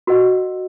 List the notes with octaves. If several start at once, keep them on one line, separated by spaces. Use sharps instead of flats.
F#4 A#4 D#5 F#5